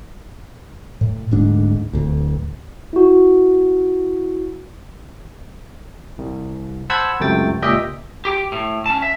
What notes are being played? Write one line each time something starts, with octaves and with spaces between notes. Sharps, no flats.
A2
D1 D2 G#2 D4
D1 D2
E4 F#4
C2
C5 F#5 A5 B5 E6 G#6
C#2 F#2 C3 A3 G5 A6
C#2 A#2 G4 D#5 E5 G5
G4 G5
A2
C#4 A5
E5